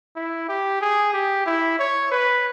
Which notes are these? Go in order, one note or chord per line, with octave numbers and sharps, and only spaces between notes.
E4
G4
G#4
G4
E4
C#5
B4